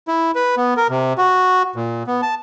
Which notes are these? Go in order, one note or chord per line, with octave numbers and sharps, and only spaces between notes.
E4
B4
B3
A#4
C3
F#4
A#2
B3
A5